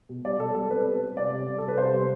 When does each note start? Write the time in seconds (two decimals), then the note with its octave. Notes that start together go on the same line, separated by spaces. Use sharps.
0.09 B2
0.24 G3 D5
0.39 B2 A4
0.55 G3 A4
0.70 C4 B4
0.86 G3
1.01 C4
1.17 C3 D5
1.32 G3
1.48 C3
1.58 G3 A4
1.68 B4
1.78 C3 C5
1.94 G3